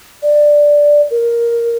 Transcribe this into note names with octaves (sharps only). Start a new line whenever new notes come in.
D5
A#4